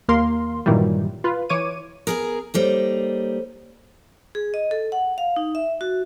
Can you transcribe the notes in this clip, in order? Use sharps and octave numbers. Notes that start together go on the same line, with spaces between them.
D#2 A#3 A#4 F5 C6
G2 A#2 D#3 E3 F#3 G3
F4 B4
E3 C#5 D6 D#7
B3 G#4 A#4 D#6
G3 A#3 D#4 A4 C5 C#5
G#4
D#5
A4
F#5
F5
D#4
E5
F#4